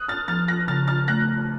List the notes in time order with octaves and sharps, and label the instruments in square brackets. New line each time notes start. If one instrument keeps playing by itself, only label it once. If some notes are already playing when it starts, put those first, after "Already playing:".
Already playing: [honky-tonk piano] D#6 F#6
F6 A6
[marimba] F3 [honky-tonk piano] F6 A6
[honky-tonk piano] F#6 A#6
[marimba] C#3 [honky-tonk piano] F6 A6
[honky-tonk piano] F6 A6
[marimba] A3 [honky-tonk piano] F#6 A#6